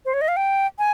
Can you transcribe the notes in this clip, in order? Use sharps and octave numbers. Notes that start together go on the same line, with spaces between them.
C5
C#5
D#5
F5
G5
G#5